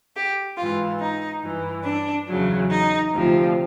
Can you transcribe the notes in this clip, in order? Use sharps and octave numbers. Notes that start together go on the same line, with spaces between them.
G4
G#2 E3 F4
D#4
G2 E3
D4
E2 C#3 F#3
D#4
D2 C3 F3